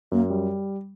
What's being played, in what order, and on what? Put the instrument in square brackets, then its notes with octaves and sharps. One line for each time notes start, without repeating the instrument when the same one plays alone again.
[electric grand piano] F#2 [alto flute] A#3
[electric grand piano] G3